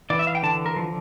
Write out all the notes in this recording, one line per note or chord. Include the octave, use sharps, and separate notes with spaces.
E3 D5
E5
F5
G5
D3 A5
A#4
F3